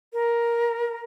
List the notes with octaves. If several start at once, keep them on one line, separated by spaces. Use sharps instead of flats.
A#4